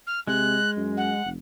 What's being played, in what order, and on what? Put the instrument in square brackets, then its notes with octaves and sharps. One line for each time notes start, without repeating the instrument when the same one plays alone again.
[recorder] F6
[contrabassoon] C3 [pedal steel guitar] G#3 [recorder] F#6
[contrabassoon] F#2
[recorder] F#5
[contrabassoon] F1